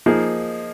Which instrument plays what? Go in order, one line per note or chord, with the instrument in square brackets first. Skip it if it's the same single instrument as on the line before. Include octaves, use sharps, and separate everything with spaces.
[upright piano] F3 A#3 D#4 G#4